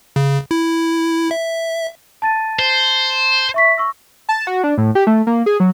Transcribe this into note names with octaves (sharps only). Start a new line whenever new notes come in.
C#3
E4
E5
A5 A6 D#7
C5
E5 C#6 B6
C#6 E6 A#6
A5
F#4
D4
A2
G4
A3
A#3
G#4
F#3